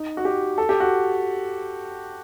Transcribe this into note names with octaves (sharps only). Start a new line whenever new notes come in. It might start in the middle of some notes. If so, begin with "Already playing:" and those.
Already playing: D#4
F#4
G4
A4
G4
F#4